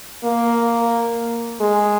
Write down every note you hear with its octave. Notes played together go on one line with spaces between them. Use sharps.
A#3
G#3